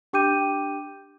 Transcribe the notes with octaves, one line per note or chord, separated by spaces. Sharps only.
D4 G4 G5 D6 G6 D#7